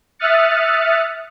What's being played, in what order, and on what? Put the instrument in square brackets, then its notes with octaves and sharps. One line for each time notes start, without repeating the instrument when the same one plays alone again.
[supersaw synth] E5 D#6 F6 F#6 A6 C#7